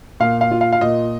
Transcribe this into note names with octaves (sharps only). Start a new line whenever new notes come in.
A#2 F5
F5
F4
F5
F5
A#2 D#5